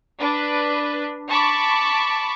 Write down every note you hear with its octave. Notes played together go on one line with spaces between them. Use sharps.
D4 B4
A5 B5 C#6 D6